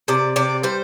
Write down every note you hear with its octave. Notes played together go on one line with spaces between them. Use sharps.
C3 D5
C3 D5
G3 C5